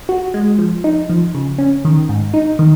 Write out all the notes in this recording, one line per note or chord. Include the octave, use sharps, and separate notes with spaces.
F#4
G#3
F3
D#4
F3
C#3
C#4
D#3
G#2
D#4
D#3